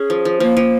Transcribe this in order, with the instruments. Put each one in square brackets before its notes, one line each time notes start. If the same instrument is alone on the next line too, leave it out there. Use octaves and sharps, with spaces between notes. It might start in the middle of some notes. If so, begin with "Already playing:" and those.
Already playing: [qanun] C#4 [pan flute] G#4
[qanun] F3
F3
[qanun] F3 [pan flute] A#3
[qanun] F3